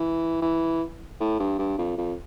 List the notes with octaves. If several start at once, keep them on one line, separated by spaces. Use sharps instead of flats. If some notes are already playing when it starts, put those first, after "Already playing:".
Already playing: E3
E3
A2
G2
G2
F2
F2